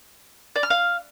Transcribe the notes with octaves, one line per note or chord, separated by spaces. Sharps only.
D5
F6
F5